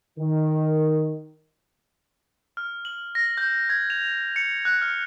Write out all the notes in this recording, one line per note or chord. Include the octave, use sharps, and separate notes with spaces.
D#3
F6
F#7
A#6
G6
G#6
F7
C#7
F#6
F6